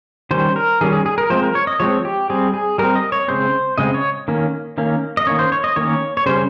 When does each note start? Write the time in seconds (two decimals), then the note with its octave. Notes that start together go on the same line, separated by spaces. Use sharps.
0.31 D#3 G3 C#4 C5
0.56 A#4
0.81 D#3 G3 C#4 G#4
0.93 G#4
1.06 G#4
1.18 A#4
1.30 F3 G#3 C4 C5
1.43 A#4
1.55 C#5
1.67 D#5
1.80 F3 G#3 C4 C#5
2.05 G4
2.30 G3 C4 G#4
2.54 G#4
2.78 G3 C4 A#4
2.95 D#5
3.12 C#5
3.28 C#3 G#3 C4 C5
3.78 C#3 G#3 C4 D#5
3.94 C#5
4.28 D#3 A#3 C#4
4.78 D#3 A#3 C#4
5.17 D#5
5.27 D#3 A#3 C#4 C#5
5.39 C5
5.52 C#5
5.64 D#5
5.76 D#3 A#3 C#4 C#5
6.17 C#5
6.26 C#3 G3 C#4 C5